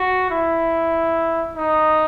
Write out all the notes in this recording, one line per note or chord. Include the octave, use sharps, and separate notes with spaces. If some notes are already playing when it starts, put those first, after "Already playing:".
Already playing: F#4
E4
D#4